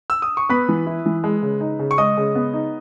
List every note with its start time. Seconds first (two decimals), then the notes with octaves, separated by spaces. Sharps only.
0.10 E6
0.22 D#6
0.37 C#6
0.49 B3 B4 B5
0.69 E3
0.87 E4
1.06 E3
1.24 G#3
1.42 C#3
1.61 D#4
1.79 C#3
1.91 C#6
1.98 G#3 D#5 D#6
2.17 C#3
2.35 B3
2.54 D#4